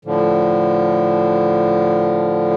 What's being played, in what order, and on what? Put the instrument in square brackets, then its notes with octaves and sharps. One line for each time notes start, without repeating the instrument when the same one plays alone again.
[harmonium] A2 D3 F3